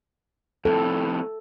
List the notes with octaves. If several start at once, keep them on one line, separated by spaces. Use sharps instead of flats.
F2 A2 A4